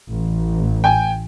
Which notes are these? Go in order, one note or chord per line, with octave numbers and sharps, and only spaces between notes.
A1
G5 G#5